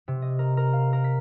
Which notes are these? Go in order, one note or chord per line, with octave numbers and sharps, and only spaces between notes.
C3
D#5
A#4
A#4
F5
A#4
B6